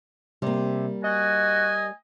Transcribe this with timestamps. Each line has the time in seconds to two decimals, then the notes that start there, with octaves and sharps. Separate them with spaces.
0.42 C3 G3 A#3
1.04 F#4 D#5 G#5